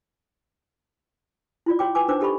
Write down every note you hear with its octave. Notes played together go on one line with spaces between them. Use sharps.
E4 F4 D5
F#4 C#5 G5 D6
B4 G#5 D6
D4 D#4 B4 C5 D6
G4 A4 D#5 B5 C#6